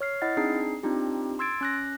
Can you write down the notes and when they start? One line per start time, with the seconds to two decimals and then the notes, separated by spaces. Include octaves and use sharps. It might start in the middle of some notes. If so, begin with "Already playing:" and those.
0.01 C#5 F6 C7
0.22 E4 D#5 F#5 F6 A6
0.37 C4 D4 D#4 G#4 C7
0.83 C4 D4 D#4 F4 G4
1.39 C6 E6 G#6 A6 D7
1.61 C#4 F#6 A#6